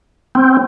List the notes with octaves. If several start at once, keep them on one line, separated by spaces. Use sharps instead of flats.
C4